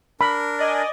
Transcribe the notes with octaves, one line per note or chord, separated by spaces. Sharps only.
D4 A#4 B5
D5 D#5 G#5